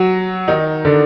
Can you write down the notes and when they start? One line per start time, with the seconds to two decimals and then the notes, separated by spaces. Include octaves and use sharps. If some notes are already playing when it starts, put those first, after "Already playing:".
Already playing: F#3 F#4
0.48 D#3 D#4
0.85 D3 D4